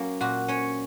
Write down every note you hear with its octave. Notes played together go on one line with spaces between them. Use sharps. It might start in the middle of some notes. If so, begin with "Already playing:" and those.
Already playing: F#3 A#3 C#4
A#2 F#4
C#4 C#5